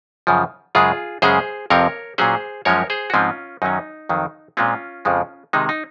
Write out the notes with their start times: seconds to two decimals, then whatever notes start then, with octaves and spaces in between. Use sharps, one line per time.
0.27 F#2 C#3 F3
0.75 F#2 C#3 G#3 F4 G#4
1.22 F#2 C#3 G#3 C#4 G#4 C5
1.70 F2 C3 F3 C4 A#4 C#5
2.18 A#2 F#3 C#4 G#4 C5
2.65 F#2 F3 G#3 C#4 A#4 C#5
2.90 G#4 C5
3.10 F#4
3.13 G#2 F3 G#3 C4 C#4 F4
3.62 F#2 D#3 F#3 C#4 D#4
4.09 F2 D#3 F#3
4.57 A#2 G#3 C4 C#4 F4
5.05 F2 C#3 F3 G#3
5.53 C3 D#3 G#3 D#4
5.69 D#4